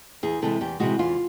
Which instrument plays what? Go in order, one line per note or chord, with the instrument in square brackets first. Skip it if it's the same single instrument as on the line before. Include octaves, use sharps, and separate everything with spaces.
[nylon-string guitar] E2 G#4
C3 E3 G#3 A4
E2 G4
C3 E3 G#3 F#4
E2 F4